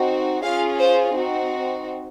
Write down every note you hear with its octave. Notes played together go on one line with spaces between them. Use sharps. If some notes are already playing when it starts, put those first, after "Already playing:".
Already playing: C4 D#4 F#4
C#4 F4 G#4 F5
C5
C4 D#4 F#4